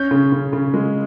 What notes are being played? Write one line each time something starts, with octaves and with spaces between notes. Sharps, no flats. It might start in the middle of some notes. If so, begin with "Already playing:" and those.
Already playing: C#4 G6
C#3
C#3
C#3
G#3